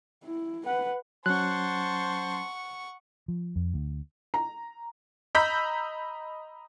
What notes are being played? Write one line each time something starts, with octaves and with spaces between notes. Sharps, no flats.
E4
B4 F#5
F#3 C#4 C5 F#5 A5 C6 C#6 F#6
F3
F2
D2
A#5
D#5 A#5 B5 E6 G6 B6